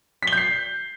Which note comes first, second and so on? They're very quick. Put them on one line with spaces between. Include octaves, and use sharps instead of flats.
B6 G7 G6 C7